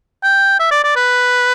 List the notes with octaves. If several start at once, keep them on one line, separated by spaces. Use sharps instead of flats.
G5
E5
D5
D5
B4